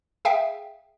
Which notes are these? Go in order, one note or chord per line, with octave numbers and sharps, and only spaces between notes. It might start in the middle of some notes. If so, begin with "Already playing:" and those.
G#4 E5 F5 G5